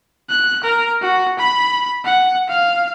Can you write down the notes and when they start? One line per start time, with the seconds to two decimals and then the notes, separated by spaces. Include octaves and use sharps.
0.29 F#6
0.63 A#4
1.01 F#4
1.39 B5
2.05 F#5
2.48 F5